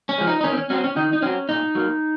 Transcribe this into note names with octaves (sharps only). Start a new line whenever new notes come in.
C#4
F3 G#3
D#4
D#4
D#3 C#4
C4
C#4
F#3 C4 C#4
C#4
D#3 D#4
D#4
F#3 C4 C#4
A#2 D#4
F#3 A#3